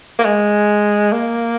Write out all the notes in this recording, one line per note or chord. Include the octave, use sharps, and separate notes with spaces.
A#3
G#3
A#3